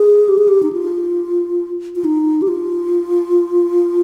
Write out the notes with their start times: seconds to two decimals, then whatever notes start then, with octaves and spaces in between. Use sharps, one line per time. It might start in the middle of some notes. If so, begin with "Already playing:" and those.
Already playing: G#4
0.28 G4
0.38 G#4
0.48 G4
0.63 D#4
0.72 F4
1.96 F4
2.04 D#4
2.42 G4
2.48 F4